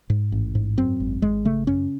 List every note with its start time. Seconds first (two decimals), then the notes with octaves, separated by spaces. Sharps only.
0.10 G#2
0.32 A1
0.55 G#2
0.77 F#2 C4
1.00 G#1
1.22 G#1 G#3
1.45 C#3 A3
1.67 F#2 C#4